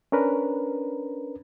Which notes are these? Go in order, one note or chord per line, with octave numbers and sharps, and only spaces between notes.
C#4 D4 A#4 B4